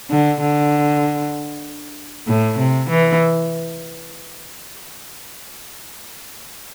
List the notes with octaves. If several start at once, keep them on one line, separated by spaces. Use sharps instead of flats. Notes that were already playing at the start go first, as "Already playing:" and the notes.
D3
D3
A2
C3
E3